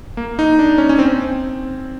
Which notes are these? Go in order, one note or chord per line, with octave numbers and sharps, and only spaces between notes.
A#3
D#4
D4
C#4
C#4
C4